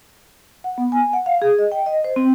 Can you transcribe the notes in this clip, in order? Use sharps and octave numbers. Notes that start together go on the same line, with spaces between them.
F#5
B3
G#5
F#5
F5
G#4
D#5
G5
D#5
C5
C4